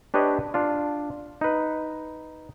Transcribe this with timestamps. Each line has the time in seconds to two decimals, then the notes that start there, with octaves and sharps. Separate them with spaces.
0.14 D4 G4 B4 C#5 D#5
0.54 D4 F4
1.41 D#4 B4